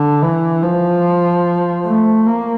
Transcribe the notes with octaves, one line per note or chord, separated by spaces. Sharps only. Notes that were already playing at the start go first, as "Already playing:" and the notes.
Already playing: D3
E3
F3
A3
A#3